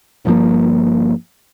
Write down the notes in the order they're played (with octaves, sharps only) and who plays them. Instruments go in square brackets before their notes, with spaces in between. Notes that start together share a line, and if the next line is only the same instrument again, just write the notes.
[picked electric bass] G1 G2 F3 A#3